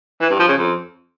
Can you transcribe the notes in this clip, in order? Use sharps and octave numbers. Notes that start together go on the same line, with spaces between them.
E3
G2
F3
C#3
F2